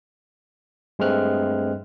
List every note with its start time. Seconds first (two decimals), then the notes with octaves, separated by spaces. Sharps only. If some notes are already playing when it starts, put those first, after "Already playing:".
0.99 G2 G#3 A3 C4 F6 F#6